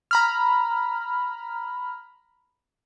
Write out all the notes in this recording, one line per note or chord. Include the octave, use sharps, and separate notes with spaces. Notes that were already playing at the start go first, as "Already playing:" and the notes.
A#5 B5 F6